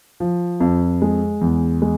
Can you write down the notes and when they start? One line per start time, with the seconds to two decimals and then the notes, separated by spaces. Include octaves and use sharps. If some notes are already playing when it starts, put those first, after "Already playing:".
0.20 F3
0.60 F2
1.02 G#3
1.41 E2
1.82 G#3